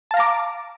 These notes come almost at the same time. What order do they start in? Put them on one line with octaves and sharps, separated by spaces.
A5 F5 A#5 D6